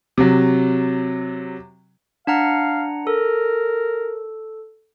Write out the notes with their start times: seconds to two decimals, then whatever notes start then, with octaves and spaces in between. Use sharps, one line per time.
0.18 C3 F#3
2.27 D4 F5 F#5 A#5
3.07 A4 A#4